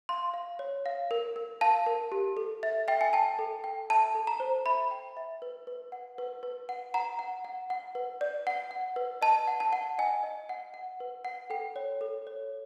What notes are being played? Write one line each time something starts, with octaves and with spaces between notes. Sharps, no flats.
F5 C6
F5
C#5
F5
A#4
A#4
F5 A5
A#4
G4
A4
E5
E5 G5
G#5
G5 A5
A4
G5
E5 A5
A4
A#5
C5
E5 B5
G5
E5
B4
B4
F#5
B4
B4
F#5
F#5 A#5
F#5
F#5
F#5
B4
D5
F#5
F#5
B4
D#5 A5
F#5
A5
F#5
D#5 G#5
D#5
F#5
F#5
B4
F#5
A4 G5
C#5
A4
C#5